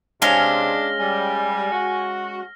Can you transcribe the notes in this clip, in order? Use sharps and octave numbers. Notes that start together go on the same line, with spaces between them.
C3 G#3 C#4 D4 F5 F6 A#6 G7
G3 G#5
F#4